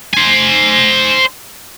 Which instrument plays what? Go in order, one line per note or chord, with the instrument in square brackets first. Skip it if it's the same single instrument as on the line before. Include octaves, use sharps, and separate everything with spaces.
[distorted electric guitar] C5 G#5